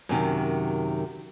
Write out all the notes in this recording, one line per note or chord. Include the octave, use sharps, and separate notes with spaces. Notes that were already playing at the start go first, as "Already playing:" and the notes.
F#2 C3 D#3